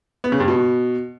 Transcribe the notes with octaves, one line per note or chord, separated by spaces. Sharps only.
B3
C#3
G2
B2